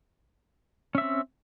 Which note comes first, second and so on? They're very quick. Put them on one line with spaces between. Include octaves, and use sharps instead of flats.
C#4 E5 C4